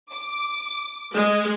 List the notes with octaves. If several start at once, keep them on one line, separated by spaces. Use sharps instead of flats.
D6
G#3